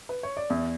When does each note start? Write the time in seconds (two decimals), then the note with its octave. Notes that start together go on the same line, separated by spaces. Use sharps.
0.09 B4
0.23 C#5
0.37 D5
0.50 E2 E5